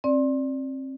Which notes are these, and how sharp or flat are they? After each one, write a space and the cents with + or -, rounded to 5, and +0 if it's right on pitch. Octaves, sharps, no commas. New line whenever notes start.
C4 +30 D5 +0